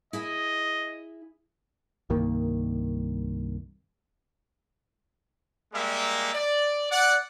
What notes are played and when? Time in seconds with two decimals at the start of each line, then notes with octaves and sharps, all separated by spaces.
0.13 E4 G#4 D#5 E5
2.10 C2 G2 D#3 A#3
5.73 G3 G#3 A#3 E5
6.33 D5
6.91 D5 F#5